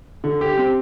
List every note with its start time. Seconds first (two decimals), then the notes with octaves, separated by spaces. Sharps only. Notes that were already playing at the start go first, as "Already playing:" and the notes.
0.24 D3
0.41 G4
0.57 C4